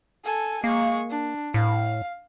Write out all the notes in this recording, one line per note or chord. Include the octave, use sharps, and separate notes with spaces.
A4 G#5
G#3 A#3 C#6
D4
A2 F5